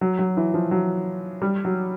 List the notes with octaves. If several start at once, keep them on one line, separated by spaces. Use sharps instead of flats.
F#3
F#3
E3
F3
F#3
G3
F#3